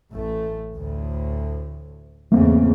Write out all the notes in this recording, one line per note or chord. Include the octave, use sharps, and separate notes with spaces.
A1 A3
D2 A2
E2 G#2 C#3 A3 A#3 C4